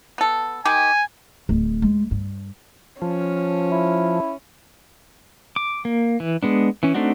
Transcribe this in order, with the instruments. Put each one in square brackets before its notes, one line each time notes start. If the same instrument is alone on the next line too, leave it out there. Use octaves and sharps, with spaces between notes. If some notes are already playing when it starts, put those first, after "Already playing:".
[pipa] B3 A4
[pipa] D#3 G4 [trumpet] G#5
[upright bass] D1
G#3
G2
[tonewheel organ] F3 [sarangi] C#4
[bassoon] E4
[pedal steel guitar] D6
A#3
E3
G#3 B3 D4
E3 C#4
A3 C4 D4 D#4 F#4